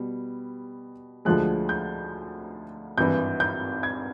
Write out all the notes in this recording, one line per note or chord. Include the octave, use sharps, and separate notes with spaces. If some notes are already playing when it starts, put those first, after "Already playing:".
Already playing: B2 G3
D2 D3 F3 G#3 F#6
G6
G#1 G2 E3 G6
G6
G#6